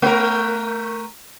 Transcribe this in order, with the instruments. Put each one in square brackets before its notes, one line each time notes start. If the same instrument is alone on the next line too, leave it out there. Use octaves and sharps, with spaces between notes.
[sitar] A3 A#4